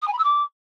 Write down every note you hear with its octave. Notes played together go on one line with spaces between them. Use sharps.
D#6
G#5
B5
E6
D6